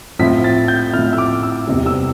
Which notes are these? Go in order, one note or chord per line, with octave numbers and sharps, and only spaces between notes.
A2 F3 C4 E4 B6
A6
G6
A2 F3 C4 E4 F6
E6
D6
E6
E2 C3 E3 G3
E6